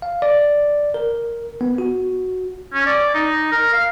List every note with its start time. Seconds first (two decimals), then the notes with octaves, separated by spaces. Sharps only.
0.02 F5
0.22 D5
0.94 A#4
1.61 B3
1.78 F#4
2.74 C#4
2.86 D5
3.14 D#4
3.52 A#4
3.73 F5